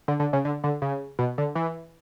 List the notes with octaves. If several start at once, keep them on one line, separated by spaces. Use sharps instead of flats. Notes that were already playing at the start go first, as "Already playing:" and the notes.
D3
D3
C#3
D3
D3
C#3
B2
D3
E3